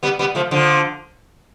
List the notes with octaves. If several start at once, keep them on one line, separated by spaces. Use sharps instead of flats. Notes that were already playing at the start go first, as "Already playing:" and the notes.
G3 B3
G3 B3
F3 A3
D3 F3